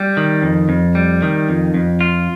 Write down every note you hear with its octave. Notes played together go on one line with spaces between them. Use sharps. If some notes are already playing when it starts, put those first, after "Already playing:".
Already playing: G3
D#3
F2
F2
G3
D#3
F2
F2
F4